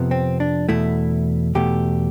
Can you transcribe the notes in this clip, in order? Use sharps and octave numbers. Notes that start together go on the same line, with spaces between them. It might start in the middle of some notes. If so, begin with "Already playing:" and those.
Already playing: F2 C3 F3 B3
C4
D4
E2 B2 A3 E4
E2 B2 A3 G4